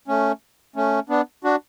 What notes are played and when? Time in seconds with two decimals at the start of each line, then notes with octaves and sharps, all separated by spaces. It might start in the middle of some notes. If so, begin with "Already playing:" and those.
0.08 A3 C#4
0.76 A3 C#4
1.09 B3 D4
1.44 D4 F#4